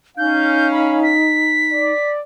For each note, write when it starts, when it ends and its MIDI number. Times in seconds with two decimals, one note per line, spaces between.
0.18 1.16 61
0.18 1.92 63
0.18 1.16 77
0.18 0.70 91
0.72 1.00 83
1.03 2.10 95
1.72 2.21 74